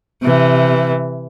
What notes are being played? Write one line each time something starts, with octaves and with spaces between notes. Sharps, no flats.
C3 E3